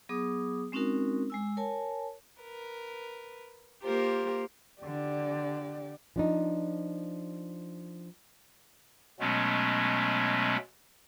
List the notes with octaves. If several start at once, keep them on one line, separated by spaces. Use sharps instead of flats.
F#3 B3 G#4 D6 D#6
G#3 C4 C#4 D#4 F#4 A#4
G#3 G#5 E6
A#4 C#5 G#5 A5
A#4 B4
A#3 F4 G4 A#4 C5
D3 G4 D5
F3 D4 D#4
B2 F#3 G#3 A3 B3 C#4